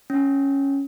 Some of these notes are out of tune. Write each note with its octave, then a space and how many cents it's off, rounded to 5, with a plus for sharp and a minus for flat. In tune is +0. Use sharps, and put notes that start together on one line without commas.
C#4 -5